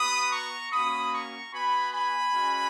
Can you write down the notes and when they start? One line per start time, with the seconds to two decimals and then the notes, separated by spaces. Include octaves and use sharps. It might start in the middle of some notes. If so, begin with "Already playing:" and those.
Already playing: B3 F#4 B5 D#6
0.32 A#5 C#6
0.72 A#3 C#4 F#4 B5 D#6
1.12 A#5 C#6
1.52 B3 F#4 G#5 B5
1.93 G#5 B5
2.33 G#3 C#4 F#4